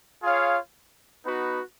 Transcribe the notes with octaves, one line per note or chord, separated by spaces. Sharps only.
F4 G#4 C#5 F5
B3 D#4 F#4 B4